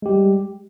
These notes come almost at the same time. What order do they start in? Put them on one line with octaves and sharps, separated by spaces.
G#3 G4 G3